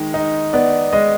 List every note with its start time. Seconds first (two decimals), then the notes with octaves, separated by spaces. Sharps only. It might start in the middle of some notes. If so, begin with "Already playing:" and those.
Already playing: D#3 G#3
0.14 D#4
0.53 B3 D5
0.93 G#3 D#5